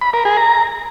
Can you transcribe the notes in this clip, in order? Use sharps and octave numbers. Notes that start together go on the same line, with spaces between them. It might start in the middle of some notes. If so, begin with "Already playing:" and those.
B5
A#4
G#4
A#5